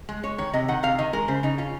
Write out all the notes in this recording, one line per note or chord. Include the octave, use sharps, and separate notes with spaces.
G#3
G#3 C#5
D#3 C#5
C3 D#5
D#3 F#5
C3 F5
D#3 D#5
G#3 A#4
C#3 C5
C#3 D#4
C#4 F4